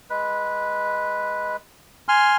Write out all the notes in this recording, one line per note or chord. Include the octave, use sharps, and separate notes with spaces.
G#3 B4
G#5 C6 F6